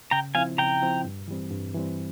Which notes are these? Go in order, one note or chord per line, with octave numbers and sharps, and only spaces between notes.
C#3 G5 A#5
F3 C4 E4 F5 G#5
C#3 G5 A#5
F3 C4 E4
G2
E3 G3 C4
G2
E3 G3 C4